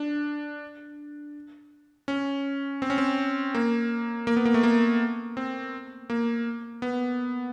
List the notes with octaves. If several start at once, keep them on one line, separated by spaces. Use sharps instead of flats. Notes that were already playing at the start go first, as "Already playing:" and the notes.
Already playing: D4
C#4
C4
C#4
C4
A#3
A#3
B3
A#3
A3
A#3
C4
A#3
B3